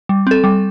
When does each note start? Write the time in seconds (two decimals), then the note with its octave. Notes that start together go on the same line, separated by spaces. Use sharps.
0.09 G3
0.27 C4 A4
0.44 G3